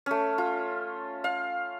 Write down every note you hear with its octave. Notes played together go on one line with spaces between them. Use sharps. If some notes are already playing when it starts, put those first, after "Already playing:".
A3 C#4
F4
F5